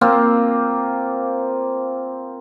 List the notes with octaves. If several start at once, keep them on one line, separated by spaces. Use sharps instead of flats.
A#3 C4 F4